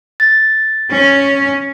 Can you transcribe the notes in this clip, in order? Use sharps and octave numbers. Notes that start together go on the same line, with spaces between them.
A6
C#4